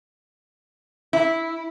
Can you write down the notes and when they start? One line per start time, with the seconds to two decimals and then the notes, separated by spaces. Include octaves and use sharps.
1.13 E4